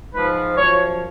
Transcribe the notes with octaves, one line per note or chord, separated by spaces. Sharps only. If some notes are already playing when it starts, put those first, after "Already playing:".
G#2 F3 B4
F#2 F3 C#5